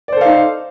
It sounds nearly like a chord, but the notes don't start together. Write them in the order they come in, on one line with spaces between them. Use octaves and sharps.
D5 C5 A4 F5 D#4